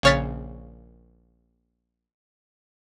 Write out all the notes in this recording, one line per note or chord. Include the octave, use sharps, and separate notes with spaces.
A#1 C#3 C#5 F6 A6 B6